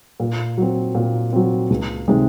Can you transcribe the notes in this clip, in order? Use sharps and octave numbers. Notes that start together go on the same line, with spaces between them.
A#2
F#3 C4
A#2
F#3 C4
C#2
C3 D#3 G#3